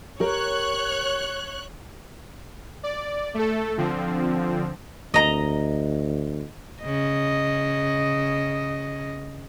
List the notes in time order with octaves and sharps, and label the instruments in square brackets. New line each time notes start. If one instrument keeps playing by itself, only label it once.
[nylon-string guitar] G4 A#4 [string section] C#5 F#6
[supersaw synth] D5
A3 A4
D3 F3 C4
[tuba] D2 [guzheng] D#5 A#5
[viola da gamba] C#3 D#5